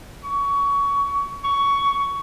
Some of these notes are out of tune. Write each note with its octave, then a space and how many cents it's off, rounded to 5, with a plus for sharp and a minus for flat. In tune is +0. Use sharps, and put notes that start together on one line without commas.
C#6 +25
C#6 +15